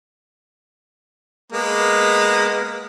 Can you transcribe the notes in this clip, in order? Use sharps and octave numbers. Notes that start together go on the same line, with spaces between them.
G#3 A#3 B3